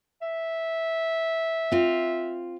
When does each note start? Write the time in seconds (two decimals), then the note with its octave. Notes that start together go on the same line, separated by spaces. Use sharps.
0.22 E5
1.72 C4 F4